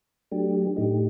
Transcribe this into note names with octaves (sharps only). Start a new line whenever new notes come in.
F#3 A3 D4 G4
A2 A3 D#4 G4